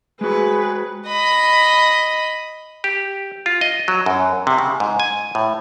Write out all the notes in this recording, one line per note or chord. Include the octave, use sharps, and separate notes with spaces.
G#3 F#4 G#4 B4
D#5 B5
G4
F4
D#5
F#3
F#2
C3
C#3
G#2
G#5
A2